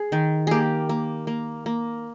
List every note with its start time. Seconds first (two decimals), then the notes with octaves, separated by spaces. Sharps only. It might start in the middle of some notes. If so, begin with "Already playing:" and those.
Already playing: G#4
0.12 D#3
0.47 A#3 G4 G#4
0.89 A#3
1.27 A#3
1.66 A#3